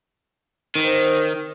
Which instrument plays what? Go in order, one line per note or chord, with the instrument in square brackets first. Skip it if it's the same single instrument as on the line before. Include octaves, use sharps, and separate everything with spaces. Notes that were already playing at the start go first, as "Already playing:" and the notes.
[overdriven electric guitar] D#3 [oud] C4 G#4 B4